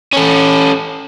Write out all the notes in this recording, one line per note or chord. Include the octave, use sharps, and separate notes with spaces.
C#4 A4